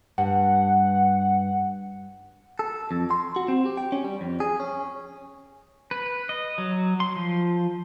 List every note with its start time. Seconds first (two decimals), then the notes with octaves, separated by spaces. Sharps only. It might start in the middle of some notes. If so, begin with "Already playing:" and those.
0.18 G2 F#5
2.59 A4
2.91 F2
3.11 C6
3.36 F#4
3.48 C4
3.66 G4
3.77 G5
3.92 C#4
4.04 G3
4.21 F2
4.40 G#4
4.60 C#4
5.91 B4
6.29 D#5
6.58 F#3
7.00 C6
7.16 F3